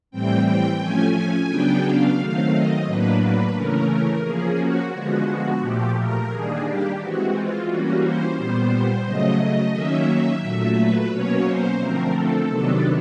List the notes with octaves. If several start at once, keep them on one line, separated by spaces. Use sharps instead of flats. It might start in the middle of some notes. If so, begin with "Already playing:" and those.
A2 E3 G3 C4 G5
G5
F3 A3 C#4 G#5
C#3 F#3 B3 D4 G5
F5
D#3 F#3 A3 C4
D#5
A2 F#3 A#3 D4 B4
B4
C#3 E3 A3 C#4 A#4
F3 A#3 C#4 G#4
F#4
D3 F3 G#3 B3 F#4
F#4
A#2 F3 A3 G4
A#4
D#3 G3 A#3 D4 G#4
G4
E3 G#3 C4 F#4
F4
E3 G3 A#3 C#4 F#4
C5
A#2 G3 B3 C5
C#3 F#3 A3 D#5
D#3 F#3 A#3 C#4 E5
A#2 F#3 A3
B4
B2 F#3 A#3 C#4 C#5
C5
D3 F3 A3 C4 A#4
A4
C3 D#3 F#3 B3 D4